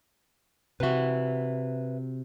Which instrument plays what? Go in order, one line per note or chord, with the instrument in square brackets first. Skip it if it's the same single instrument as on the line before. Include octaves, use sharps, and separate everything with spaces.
[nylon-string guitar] C3 F#4 [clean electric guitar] B4 E5